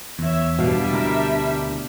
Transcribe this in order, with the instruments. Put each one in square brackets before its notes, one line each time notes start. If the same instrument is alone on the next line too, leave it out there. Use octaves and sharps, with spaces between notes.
[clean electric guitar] E2 [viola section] C#5 E5
[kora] B2 F5 [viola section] G3 [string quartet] D4 E5
[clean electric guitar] D2 E4 A#4